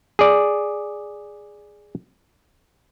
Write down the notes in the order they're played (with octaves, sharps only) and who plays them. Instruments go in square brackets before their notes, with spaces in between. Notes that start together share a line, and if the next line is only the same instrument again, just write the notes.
[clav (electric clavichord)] G#4 D5